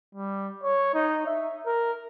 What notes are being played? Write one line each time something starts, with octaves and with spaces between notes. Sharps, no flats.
G3
C#5
D#4
E5
A#4